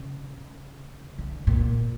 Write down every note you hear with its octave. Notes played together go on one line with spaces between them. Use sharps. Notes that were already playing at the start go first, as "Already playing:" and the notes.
Already playing: C#3
D3
A#2